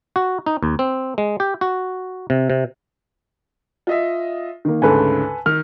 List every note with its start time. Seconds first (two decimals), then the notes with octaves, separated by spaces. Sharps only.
0.16 F#4
0.46 D#4
0.63 D#2
0.79 C4
1.18 G#3
1.40 G4
1.61 F#4
2.30 C3
2.50 C3
3.87 F4 D#5 E5
4.65 D#3 A#3
4.82 D2 G#2 C#3 A4 B4 G#5
5.46 D#3 F6